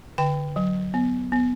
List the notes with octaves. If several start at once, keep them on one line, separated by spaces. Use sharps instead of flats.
D3 G5
F#3
B3
B3